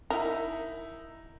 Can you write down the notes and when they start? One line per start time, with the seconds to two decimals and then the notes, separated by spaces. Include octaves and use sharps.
0.10 D#4 E4 A#4